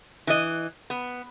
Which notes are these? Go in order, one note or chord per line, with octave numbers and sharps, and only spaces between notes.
E3 D#5
B3